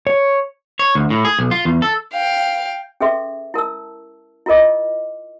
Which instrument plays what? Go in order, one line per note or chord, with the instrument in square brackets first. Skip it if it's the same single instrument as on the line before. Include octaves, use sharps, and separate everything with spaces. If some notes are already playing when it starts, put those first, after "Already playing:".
[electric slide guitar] C#5
[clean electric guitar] C#5
D2
A2
G#4
B1
F4
E2
A4
[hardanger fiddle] F5 G5
[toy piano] C#4 G#4 A4 B4 E5 C6
E4 A#4 A5 E6
E4 F4 A#4 D#5 D6